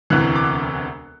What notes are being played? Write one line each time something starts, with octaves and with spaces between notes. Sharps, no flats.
E1 D2 C3 E3 F#6
D6